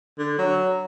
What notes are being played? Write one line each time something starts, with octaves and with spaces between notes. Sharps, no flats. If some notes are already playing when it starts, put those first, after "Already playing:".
D3
F#3